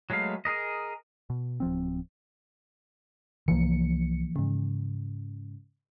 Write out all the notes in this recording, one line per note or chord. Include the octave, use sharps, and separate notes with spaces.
F#3 G#3 A3 B4 F5
G#4 A#4 D#5
B2
D1 F3 C4
C2 E3 F3 A#3 C#7
G#2 C#3